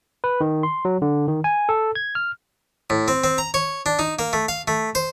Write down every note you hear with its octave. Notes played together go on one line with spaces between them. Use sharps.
B4
D#3
C6
F#3
D3
D#3
G#5
A4
G#6
F6
A2
C4
C4
A#5
C#5
D4
D#4
A#3
A3
F5
A3
C5